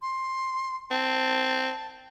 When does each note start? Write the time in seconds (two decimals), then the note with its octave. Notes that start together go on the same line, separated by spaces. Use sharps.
0.02 C6
0.91 C4 A5